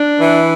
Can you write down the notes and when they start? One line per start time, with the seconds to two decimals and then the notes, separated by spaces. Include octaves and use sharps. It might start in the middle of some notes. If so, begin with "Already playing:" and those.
Already playing: D4
0.19 E3